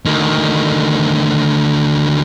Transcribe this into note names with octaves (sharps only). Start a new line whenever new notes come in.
D2 D#3